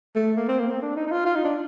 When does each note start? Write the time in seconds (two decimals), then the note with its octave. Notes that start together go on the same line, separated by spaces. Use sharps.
0.16 A3
0.37 A#3
0.49 C4
0.59 A#3
0.70 C4
0.82 D4
0.96 D#4
1.07 D#4
1.12 F4
1.26 F4
1.36 D#4
1.44 D4